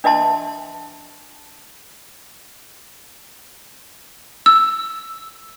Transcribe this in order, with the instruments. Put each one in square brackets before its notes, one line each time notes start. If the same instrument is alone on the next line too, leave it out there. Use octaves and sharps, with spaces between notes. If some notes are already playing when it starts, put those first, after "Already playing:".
[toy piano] D4 D#5 E5 A5 C6
[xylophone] E6